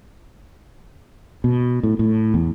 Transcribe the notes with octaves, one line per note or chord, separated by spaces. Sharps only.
B2
A2
A2
E2